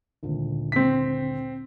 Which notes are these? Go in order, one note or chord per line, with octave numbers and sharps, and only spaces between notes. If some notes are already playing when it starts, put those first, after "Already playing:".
G#1 D2 A#2
C4 B6